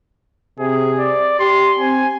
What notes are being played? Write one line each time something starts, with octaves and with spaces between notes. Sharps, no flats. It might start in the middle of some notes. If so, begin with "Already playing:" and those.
C3 G#4
D5
G4 C6
C4 G#5